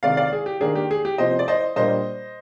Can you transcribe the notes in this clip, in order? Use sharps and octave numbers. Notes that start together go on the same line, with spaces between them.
C3 D#3 G#3 D5 F5
D5 F5
G#4
G4
D#3 A#3 D4 G#4
G4
G#4
G4
C3 F3 C4 C5 D#5
D5
C5 D#5
A#2 G3 A#3 D4 C5 D#5